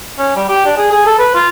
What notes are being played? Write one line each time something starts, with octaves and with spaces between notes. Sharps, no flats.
C#4
G3
G4
D4
G#4
G#4
A4
B4
F4